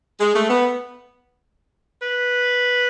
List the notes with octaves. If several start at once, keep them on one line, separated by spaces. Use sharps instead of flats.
G#3
A3
B3
B4